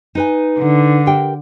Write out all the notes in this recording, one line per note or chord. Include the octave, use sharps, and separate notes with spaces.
D#4 B4 G#5
D3
G4 A#4 G5